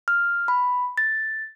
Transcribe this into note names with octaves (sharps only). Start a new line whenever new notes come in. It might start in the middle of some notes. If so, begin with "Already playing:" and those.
F6
B5
A6